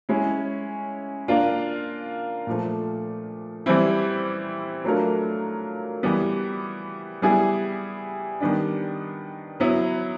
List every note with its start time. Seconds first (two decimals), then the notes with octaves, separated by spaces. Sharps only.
0.09 G#3 C#4 E4
1.28 A#3 D4 F4
2.47 A#2 F3 A3
3.66 E3 G3 C4 E4
4.84 F#3 A3 D4 F4 A#4
6.03 E3 G3 B3
7.22 G3 B3 E4 G#4
8.40 D#3 G3 B3 D4
9.60 F#3 B3 E4